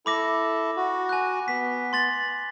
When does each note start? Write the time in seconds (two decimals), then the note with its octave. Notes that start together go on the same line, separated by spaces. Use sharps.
0.06 E4 A4 B5 D6 A#6
0.76 F#4
1.09 G#5 F#6
1.48 B3 B6
1.93 C6 A6 F#7